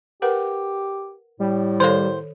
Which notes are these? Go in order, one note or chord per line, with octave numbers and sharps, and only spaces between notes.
G4 A#4 B4 F#5
A2 G3
D#3 A#3 A4 C5 C#5